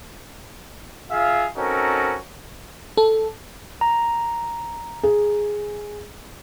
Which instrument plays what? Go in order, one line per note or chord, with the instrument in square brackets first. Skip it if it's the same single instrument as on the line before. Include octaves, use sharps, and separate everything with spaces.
[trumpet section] F4 G#4 E5 F5
C4 C#4 D#4 F#4 A4 A#4
[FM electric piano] A4
[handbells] A#5
[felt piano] G#4